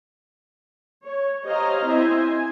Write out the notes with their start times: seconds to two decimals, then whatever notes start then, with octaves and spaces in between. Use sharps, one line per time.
1.04 C#5
1.45 G4 C5 C#5 D#5 F5 A#5
1.85 C4 E4 C5 D#5 E5 G#5
2.17 G#5